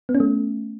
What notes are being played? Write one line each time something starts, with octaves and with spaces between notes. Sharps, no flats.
B3
C#4
A3